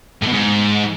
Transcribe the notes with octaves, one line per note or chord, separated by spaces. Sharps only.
A2
B2
G#2